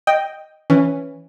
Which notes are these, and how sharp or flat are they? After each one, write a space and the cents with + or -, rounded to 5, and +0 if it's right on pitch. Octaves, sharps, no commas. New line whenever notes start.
D#5 +0 G5 +0
E3 +0 C#4 +0